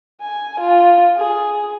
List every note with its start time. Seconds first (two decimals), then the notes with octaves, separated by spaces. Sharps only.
0.21 G#5
0.60 F4
1.17 G#4